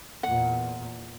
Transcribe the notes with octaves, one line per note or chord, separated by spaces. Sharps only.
E2 A#2 F#5